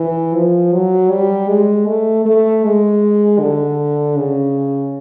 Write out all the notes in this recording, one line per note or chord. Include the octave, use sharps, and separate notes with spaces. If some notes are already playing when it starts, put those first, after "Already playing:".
Already playing: E3
F3
F#3
G3
G#3
A3
A3
G#3
D3
C#3